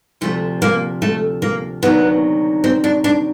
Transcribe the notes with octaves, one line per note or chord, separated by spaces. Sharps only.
D2 C3 F3 A3
A#3
A3
A#3
D2 C3 D#3 F#3 B3
C4
D4
D4